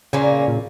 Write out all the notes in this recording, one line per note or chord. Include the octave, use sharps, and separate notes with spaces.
A#2 C#3 A#3 C#4
A#2